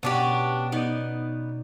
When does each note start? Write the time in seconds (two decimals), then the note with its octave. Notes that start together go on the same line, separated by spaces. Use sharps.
0.03 B2 B3 C#4 D4 G4
0.72 B3 D#4 D5